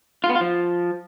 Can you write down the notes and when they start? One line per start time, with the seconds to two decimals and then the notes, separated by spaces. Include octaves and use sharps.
0.24 F4
0.30 B3
0.35 F4
0.41 F3